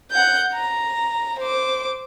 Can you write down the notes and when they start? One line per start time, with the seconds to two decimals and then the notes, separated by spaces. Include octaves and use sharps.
0.11 F#5 G6
0.53 A#5
1.39 C5 D6